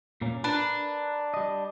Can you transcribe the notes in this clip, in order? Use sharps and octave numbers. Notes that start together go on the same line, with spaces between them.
A#2 A#3 C#4
D4 A#4 B4
G3 D#5